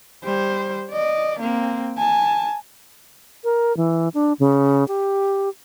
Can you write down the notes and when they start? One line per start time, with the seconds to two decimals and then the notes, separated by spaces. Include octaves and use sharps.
0.25 G3 C5
0.91 D5 D#5
1.40 A#3 C4
1.97 G#5 A5
3.44 A#4
3.77 E3
4.14 D4
4.39 C#3
4.88 G4